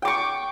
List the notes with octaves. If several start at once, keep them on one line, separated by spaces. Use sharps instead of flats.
G5 C#6 D6